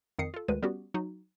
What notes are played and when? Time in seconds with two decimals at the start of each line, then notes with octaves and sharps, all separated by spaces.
0.19 F2 D#3 D#6 C7 C#7
0.34 F4 A4
0.48 D2 D#3 G#3 B4 D#7
0.62 G3 B3 C#4 F#4 G4
0.94 F#3 D#4 F#4